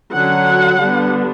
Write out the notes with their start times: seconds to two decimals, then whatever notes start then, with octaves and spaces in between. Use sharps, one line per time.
0.12 D3 F#3 C#4 F#5
0.79 D3 G3 B3 D4